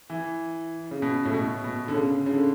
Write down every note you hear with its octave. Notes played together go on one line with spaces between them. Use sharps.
E3
C#3
B2
A2
B2
B2
D3
C#3
C#3
D3